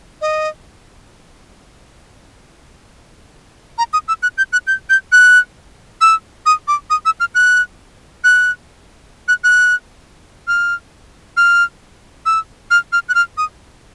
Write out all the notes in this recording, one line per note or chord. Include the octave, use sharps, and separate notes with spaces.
D#5
A#5
D#6
E6
F#6
G6
F#6
G6
G6
F#6
E6
D#6
D6
D#6
E6
F6
F#6
F#6
F#6
F#6
F6
F6
E6
F6
F6
F#6
F6
D#6